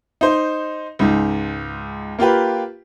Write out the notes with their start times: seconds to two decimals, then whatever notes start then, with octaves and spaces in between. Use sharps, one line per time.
0.21 D#4 C5
0.99 C#2 G#2
2.19 A#3 F4 G4 B4